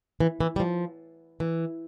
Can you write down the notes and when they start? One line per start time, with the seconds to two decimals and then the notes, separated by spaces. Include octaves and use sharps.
0.20 E3
0.41 E3
0.56 G3
0.60 F3
1.40 E3